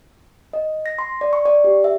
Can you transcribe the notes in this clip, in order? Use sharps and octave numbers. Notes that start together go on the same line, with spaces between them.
D#5
A#6
C6
D5
C#6
D5
G4
E5